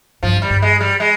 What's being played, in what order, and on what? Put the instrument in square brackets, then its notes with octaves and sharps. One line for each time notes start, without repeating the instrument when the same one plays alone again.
[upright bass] G2 [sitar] F3
[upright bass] F2
[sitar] G3
[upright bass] G2
[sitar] G#3
G3
G#3